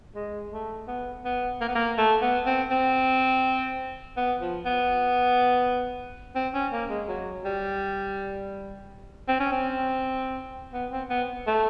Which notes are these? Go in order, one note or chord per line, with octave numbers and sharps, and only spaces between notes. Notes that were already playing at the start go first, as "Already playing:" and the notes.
G#3
A3
B3
B3
A#3
B3
A#3
A3
B3
C4
C4
B3
F3
B3
C4
C#4
A#3
G#3
F#3
G3
C4
C#4
C4
B3
C4
B3
A3